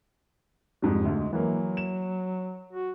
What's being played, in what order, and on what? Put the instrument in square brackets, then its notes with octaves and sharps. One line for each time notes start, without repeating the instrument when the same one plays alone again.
[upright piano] F2 G#2 G3
[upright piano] D2 [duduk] G#3
[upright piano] E3 A#3 [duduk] F#3
[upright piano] E7
[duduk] F#4